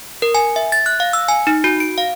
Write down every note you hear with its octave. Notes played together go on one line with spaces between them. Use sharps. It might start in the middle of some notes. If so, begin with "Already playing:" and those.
A#4
G#5
E5
A6
F#6
F5
E6
G#5
D#4
F#4
D7
F5